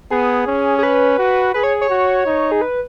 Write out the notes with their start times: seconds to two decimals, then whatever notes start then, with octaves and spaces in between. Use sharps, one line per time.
0.11 B3 G#4
0.47 C#4
0.78 G#4
0.83 B4
1.19 F#4
1.54 G#4 B4
1.63 C#5
1.81 C#5
1.90 F#4
2.26 D#4
2.52 G#4
2.61 B4